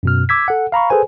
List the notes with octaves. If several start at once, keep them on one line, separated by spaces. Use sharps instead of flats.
F#2 B2 F6
D6 E6 G#6 B6
A4 F#5
F5 A#5 B5 C#6
G#4 A4 B4 C5 G#5